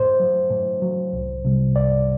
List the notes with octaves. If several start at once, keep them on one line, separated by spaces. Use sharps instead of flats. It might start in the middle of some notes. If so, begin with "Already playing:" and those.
Already playing: A2 C5
F#3
A2
F#3
C2
C3 G3
C2 D5